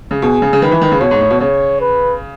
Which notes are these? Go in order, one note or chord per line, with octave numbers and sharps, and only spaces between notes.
C#3
B2 G#4
C#3
C#3
D#3 B4
E3
D#3
C#3
B2 C#5
G#2
A2
B2
C#3 C#5
B4